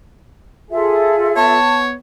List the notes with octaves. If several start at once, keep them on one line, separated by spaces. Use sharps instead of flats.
F4 G#4 A4 E5
B3 C#5 A5